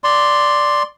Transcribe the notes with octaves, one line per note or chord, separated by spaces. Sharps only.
D5 C6